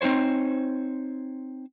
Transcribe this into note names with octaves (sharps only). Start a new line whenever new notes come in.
C4 D#4 G#4 C5 C#5